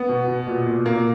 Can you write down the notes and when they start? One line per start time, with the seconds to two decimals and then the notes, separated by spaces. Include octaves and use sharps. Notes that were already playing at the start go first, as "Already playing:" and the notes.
Already playing: B3
0.09 B2
0.28 B2
0.47 A#2
0.66 A#2
0.86 A#2 A#3